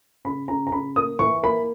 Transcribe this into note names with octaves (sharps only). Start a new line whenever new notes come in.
C#3 B5
C#3 A#5
A#5
C#3 B5
A#3 D#6
E3 C#6
A#3 B5